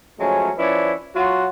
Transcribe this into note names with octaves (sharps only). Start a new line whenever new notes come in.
F3 F#3 G#3 A3 C#4
F3 C#4 E4 B4 D5
F#3 F4 F#4